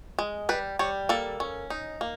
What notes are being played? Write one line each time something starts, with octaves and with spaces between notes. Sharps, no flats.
G#3
G3 B4
G3 C#5
A#3 A4
C#4
D#4
A#3